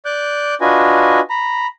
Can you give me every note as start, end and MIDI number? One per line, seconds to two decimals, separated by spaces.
0.05 0.55 74
0.05 0.55 86
0.05 0.55 90
0.05 0.55 91
0.61 1.20 62
0.61 1.20 65
0.61 1.20 66
0.61 1.20 71
0.61 1.20 75
0.61 1.20 80
1.30 1.67 82
1.30 1.67 83